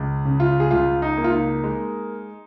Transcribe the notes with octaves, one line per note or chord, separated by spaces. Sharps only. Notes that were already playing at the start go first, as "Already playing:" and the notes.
Already playing: C#2
C#3
F4
G#4
C#2 F4
D#4
A#3
F4
D#4
G#3